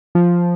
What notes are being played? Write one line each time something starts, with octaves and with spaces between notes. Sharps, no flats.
F3